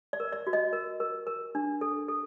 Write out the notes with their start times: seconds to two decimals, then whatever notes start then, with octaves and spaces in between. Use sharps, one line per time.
0.13 D5
0.20 A#4
0.33 D5
0.47 F#4
0.53 D#5
0.73 A#4
1.00 A#4
1.27 A#4
1.55 D4
1.81 A4
2.08 A4